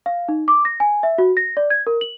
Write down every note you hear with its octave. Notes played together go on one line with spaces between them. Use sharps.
F5
D#4
D6
A#6
G#5
E5
F#4
A#6
D5
G#6
A#4
F#7